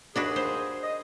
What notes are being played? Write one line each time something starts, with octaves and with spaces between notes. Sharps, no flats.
D#2 D4 F#4 G#4 B4
C5
D#5